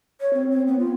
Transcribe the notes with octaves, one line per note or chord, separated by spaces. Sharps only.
C#5
C4
C4
B3
F4